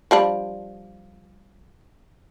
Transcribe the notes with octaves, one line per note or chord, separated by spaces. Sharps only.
F3 G3 D4